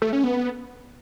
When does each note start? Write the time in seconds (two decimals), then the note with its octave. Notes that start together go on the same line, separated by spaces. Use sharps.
0.02 A3
0.13 C#4
0.24 B3